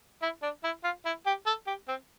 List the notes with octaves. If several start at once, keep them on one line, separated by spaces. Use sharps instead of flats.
E4
D4
E4
F4
E4
G4
A4
G4
C4